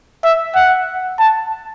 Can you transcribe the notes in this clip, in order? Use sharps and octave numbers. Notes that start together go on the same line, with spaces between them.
E5
F#5
A5